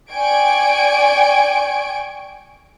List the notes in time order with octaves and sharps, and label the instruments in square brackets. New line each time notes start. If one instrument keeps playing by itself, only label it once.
[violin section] D5 G5 G#5 C#6 G#6 D7